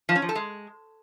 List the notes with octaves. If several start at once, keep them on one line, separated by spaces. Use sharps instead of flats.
F3
C#4
F3
A4
G#3